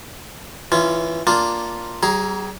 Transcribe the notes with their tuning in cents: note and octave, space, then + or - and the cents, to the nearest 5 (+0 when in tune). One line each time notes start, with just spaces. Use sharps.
E3 +0 C#4 +10 F4 -20
A#3 +0 D4 +0 F4 +0
G3 -45 G#4 +0 A#5 +15